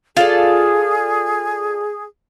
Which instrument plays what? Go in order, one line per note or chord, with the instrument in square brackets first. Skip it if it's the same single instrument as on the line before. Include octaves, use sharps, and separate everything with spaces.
[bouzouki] F4 A4 D5 [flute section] G#4